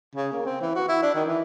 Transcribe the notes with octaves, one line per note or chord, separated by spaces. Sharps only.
C#3
A#3
C4
E3
F#4
E4
D4
D#3
E3